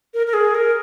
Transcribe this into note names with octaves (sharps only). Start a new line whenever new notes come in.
A#4
A#4
G#4
A#4